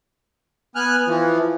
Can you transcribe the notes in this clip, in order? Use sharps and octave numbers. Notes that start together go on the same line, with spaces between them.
B3 G#5 F6 F#6
E3 F3